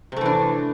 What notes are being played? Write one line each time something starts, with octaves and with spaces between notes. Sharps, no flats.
C3 E3 A3 D4